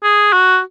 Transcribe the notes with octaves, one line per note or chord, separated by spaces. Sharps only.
G#4
F#4